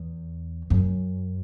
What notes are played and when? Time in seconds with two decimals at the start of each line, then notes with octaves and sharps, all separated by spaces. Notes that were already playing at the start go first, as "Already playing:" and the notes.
Already playing: E2
0.70 F#2